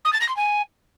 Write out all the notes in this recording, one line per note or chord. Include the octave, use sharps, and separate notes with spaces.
D#6
A6
A#6
C6
G#5